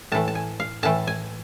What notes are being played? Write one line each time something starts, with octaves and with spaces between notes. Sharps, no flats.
A2 E3 A3 A5
A5
G#5
F5
A2 E3 A3 A5
G#5